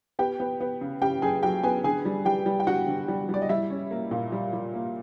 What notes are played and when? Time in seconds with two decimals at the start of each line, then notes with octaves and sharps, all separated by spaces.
0.19 B3 G4 G5
0.40 B3
0.60 B3
0.81 C#3
1.02 C#3 G4 G5
1.22 F#2 G#4 G#5
1.42 F#3 G4 G5
1.63 B3 G#4 G#5
1.84 D3 G#4 G#5
2.05 G3
2.25 G3 G4 G5
2.46 G3
2.60 G5
2.67 D3 F#4 F#5
2.87 D3
3.08 G3
3.29 G3 D5
3.42 D#5
3.49 G3 E4 E5
3.70 C#4
3.91 A#3
4.11 A#2
4.32 G3
4.53 G3
4.74 A#3